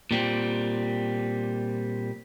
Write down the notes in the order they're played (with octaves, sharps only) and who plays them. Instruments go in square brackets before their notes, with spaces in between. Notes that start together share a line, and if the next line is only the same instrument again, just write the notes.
[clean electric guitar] A#2 G3 C4